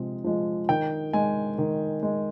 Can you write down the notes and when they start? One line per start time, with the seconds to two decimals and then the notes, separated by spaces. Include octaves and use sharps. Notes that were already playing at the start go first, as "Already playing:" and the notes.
Already playing: C3 F3 G#3
0.24 F3 G#3
0.69 D#3 G5
1.13 G#3 G#5
1.58 D#3
2.03 G#3